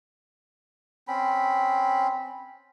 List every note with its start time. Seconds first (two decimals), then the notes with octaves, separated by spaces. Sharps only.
1.08 C4 C#4 B5